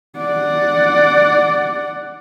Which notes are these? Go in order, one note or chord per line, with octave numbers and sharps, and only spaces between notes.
D5 F#5